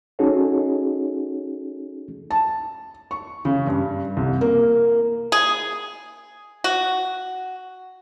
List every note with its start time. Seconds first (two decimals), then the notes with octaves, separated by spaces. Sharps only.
0.19 C#4 D#4 F#4 G#4 A4 C#5
2.30 A5
3.11 C#6
3.45 C#3
3.67 G2
4.17 C2
4.41 A#3
5.32 G#4
6.64 F#4